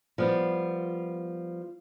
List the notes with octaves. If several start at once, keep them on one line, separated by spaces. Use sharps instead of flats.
F3 G3 B3